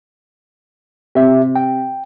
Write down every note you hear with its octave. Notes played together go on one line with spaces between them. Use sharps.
C3 G4 E5
G5